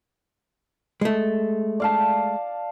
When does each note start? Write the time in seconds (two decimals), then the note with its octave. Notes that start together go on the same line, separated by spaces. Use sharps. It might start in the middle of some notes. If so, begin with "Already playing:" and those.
1.01 G#3 A3
1.80 D5 F5 A5